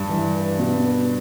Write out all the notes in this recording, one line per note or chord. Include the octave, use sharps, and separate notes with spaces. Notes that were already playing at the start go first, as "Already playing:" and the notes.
Already playing: G2 D5
E3
B4
B2
B4